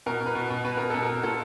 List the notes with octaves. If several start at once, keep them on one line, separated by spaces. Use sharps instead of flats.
B2 A#4
B2
B4
B2
B2
B2 B4
B2 A#4
B2 A4
A#4
B2
A#2 A4